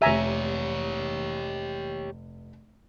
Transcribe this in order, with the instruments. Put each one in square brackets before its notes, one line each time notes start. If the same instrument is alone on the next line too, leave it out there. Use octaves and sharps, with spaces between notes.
[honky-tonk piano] F1 D#7 [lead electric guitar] G4 C#5 [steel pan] E5 G#5 A#5